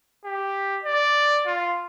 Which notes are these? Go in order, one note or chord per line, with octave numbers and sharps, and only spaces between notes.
G4
D5
F4